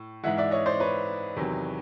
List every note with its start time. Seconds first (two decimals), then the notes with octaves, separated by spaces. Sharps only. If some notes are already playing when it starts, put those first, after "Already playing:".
Already playing: A2
0.23 G#2 E3 G#3 E5 F#5
0.38 D5 E5
0.51 C#5 D#5
0.66 C5 D5
0.80 B4 C#5
1.36 E2 C3 D#3 F#3